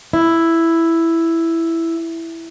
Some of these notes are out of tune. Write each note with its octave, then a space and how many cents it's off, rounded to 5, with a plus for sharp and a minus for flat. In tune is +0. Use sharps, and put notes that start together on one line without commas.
E4 +5